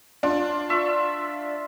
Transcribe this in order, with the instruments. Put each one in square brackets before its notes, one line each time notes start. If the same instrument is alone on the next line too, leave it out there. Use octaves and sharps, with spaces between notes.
[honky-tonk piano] D4 [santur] F4
[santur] F4 E5 C#6